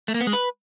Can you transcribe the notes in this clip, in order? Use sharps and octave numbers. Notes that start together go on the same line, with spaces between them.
A3
A#3
B3
G#3
B4